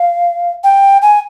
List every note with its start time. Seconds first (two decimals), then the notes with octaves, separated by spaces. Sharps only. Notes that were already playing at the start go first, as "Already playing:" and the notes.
Already playing: F5
0.64 G5
1.02 G#5